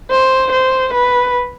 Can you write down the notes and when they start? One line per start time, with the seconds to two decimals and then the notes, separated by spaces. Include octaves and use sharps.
0.11 C5
0.52 C5
0.94 B4